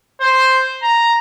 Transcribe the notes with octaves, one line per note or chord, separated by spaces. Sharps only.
C5
A#5